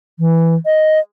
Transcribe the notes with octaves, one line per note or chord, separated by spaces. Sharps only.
E3
D#5